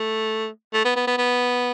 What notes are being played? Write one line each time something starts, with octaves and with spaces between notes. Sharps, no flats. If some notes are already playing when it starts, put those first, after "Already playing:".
Already playing: A3
A3
B3
B3
B3
B3